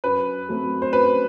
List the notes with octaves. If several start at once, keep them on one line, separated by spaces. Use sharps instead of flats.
F#2 B4
F#3 A3 C4
C5
F#2 B4